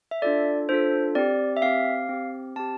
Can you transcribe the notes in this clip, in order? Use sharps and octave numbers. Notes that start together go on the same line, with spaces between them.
E5
D4 F4 A4 D5
D4 F4 A4 C5
C4 G4 D5
E5
C4 G4 F5
C4 G4
C4 G4 A5